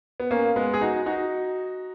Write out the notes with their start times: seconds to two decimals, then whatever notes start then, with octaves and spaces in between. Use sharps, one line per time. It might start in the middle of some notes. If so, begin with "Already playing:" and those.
0.20 B3
0.31 A#3 C#4
0.56 G#3 B3
0.74 G#4
0.81 D#4 F#4
1.06 D#4 F#4